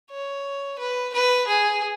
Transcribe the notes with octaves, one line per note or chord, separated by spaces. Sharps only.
C#5
B4
B4
G#4